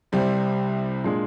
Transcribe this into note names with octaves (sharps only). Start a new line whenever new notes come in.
C2 C3 G3 C4
A#2 G#3 D4 G#4